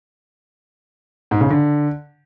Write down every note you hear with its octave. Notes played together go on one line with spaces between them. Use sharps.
G#2
C#3
D3